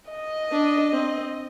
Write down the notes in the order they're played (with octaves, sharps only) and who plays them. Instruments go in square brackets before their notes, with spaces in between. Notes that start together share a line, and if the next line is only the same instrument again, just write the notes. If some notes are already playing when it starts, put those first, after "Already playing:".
[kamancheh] D#5
[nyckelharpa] D4
C4